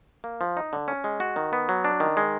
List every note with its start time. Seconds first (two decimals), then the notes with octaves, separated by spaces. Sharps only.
0.24 A#3
0.41 F3
0.57 D#4
0.73 D3
0.88 C#4
1.04 G#3
1.20 F#4
1.36 D#3
1.53 B3
1.69 F#3
1.85 D4
2.00 D#3
2.17 G#3